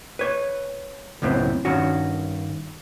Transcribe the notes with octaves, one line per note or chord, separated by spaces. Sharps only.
B4 C#5
C#2 F#2 A2 B3 C4
G2 D#3 C#4 F#4